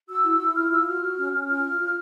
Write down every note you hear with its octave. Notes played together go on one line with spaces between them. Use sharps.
F#4 E6
E4
E4
F4 F6
F4 E6
F#4 F6
F#4
C#4
C#4
F4 F6
F4
F4